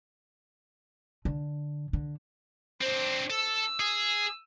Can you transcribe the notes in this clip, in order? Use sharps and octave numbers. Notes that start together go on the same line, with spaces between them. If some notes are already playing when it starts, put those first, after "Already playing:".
D3
D3
C4 D4 C5
A4 E6
G#4